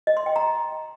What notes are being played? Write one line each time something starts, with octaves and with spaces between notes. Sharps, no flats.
D#5
C6
G5
A#5